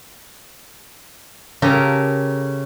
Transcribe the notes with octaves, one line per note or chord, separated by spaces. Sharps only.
C#3 G4 A4 A#4